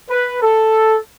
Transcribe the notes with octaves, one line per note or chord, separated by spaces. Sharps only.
B4
A4